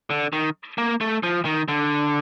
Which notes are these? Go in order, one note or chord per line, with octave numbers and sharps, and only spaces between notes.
D3
D#3
A#3
A3
F3
D#3
D3